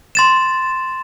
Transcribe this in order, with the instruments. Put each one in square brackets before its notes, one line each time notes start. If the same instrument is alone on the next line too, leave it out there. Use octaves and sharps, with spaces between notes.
[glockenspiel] C6 A6 E7